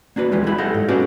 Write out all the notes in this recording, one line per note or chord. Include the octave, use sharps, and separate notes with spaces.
A#3 D4 F#4 B4
D2 D3 E3 F3 G3 G#3
F#3 G#3 E4 B5
G4 A4 D#5 F5 F#5
G#2
C#4 F#4 G#4 A4 B4 D5